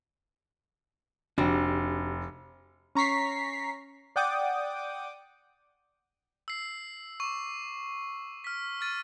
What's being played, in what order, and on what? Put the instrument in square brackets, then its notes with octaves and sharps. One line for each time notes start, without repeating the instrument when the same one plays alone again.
[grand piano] F1 [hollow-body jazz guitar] D4 F#4 G4
[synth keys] C#4 A#5 C#6 B6 C7
D5 F#5 G5 D6 D#6
[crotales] E6 C7
C#6 D6
F6 B6
F6 A6 D#7